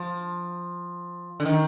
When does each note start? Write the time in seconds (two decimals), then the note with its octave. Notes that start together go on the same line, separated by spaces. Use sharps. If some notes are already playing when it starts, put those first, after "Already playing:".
Already playing: F3
1.40 D3
1.45 D#3